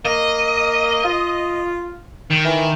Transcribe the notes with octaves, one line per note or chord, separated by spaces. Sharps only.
A#3 D#5
F4
D#3
E3